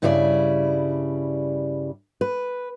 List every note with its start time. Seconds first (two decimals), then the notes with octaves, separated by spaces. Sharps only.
0.02 G2 C#3 G3 E4 A#4 D5
2.21 B4